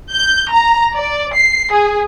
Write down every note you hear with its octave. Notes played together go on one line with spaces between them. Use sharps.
G6
A#5
D5
C7
G#4